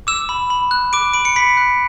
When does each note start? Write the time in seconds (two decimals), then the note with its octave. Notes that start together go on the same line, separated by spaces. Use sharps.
0.07 D6 E6 E7
0.29 B5
0.50 B5
0.71 F#6
0.93 D6 D7
1.14 B5 D7
1.25 C#7
1.36 B5 B6
1.57 F#6